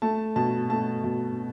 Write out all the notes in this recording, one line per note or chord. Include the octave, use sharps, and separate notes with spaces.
A3 A5
B2 A5
A3 A5
B2